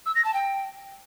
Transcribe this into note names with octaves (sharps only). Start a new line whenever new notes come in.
E6
A#6
A5
G5